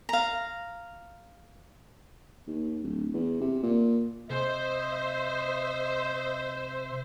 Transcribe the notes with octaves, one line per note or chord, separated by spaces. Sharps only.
F5 A#5
D#2
D1
E2
C3
A#2
C3 C5 D#5 E5